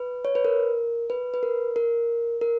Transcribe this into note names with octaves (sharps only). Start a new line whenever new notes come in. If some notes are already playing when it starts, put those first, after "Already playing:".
Already playing: B4
C#5
B4
A#4
B4
B4
A#4
A#4
A#4